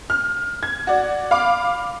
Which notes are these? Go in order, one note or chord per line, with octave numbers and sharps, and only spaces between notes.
F6
G#6
F#4 D5
F5 B5 D6